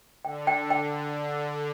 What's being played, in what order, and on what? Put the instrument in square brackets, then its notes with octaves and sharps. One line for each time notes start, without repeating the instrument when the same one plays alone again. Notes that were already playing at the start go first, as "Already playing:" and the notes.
[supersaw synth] D3 [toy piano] G5
[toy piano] G5
G5